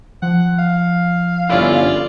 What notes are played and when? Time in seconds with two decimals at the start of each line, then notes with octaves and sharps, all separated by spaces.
0.22 F3 F#5
0.59 F5
1.49 G1 C#4 E4 F4 D5